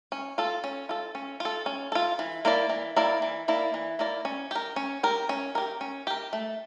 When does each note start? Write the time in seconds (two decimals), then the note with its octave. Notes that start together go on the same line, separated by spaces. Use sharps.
0.12 C#4
0.38 F4 A4
0.64 C#4
0.89 F4 A4
1.15 C#4
1.40 F4 A4
1.66 C#4
1.92 F4 A4
2.19 E3
2.45 A#3 E4 A#4 D5
2.69 E3
2.96 A#3 E4 A#4 D5
3.22 E3
3.48 A#3 E4 A#4 D5
3.74 E3
3.99 A#3 E4 A#4 D5
4.25 C#4
4.51 G4 A#4
4.76 C#4
5.03 G4 A#4
5.29 C#4
5.55 G4 A#4
5.81 C#4
6.07 G4 A#4
6.33 A3